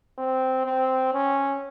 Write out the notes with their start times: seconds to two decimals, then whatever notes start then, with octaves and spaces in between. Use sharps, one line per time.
0.18 C4
0.66 C4
1.13 C#4